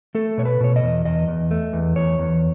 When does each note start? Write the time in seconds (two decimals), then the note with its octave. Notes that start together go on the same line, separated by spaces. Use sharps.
0.15 A3 A4
0.38 B2 C#5
0.45 B4
0.60 B2 C#5
0.76 D#5
0.83 E2
1.05 E2 D#5
1.28 E2
1.51 A3
1.73 E2
1.96 E2 C#5
2.19 E2